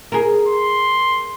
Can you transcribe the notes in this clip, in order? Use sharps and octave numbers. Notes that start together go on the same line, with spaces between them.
G#4 A#4
C6